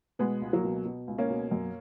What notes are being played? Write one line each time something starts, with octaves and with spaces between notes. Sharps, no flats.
B2 G#3 B3
C#2
F#3 A#3
B2
B2
C#2
A#3 C#4
B2
F#2